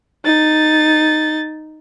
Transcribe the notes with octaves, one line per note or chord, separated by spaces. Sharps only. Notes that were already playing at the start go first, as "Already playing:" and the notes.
D#4 A6